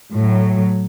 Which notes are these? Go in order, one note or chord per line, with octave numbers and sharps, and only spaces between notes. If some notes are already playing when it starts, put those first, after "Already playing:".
A2 F#3